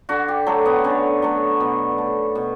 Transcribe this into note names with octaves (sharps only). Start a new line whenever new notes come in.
D3 F#4
G4
F#3 A3 A4
B3
D3 C#4
F#3 A3
B2
A3
B2